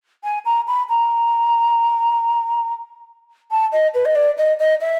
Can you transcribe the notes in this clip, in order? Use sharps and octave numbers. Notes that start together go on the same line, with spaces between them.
G#5
A#5
B5
A#5
A5
D#5
B4
D#5
D5
D#5
D#5
E5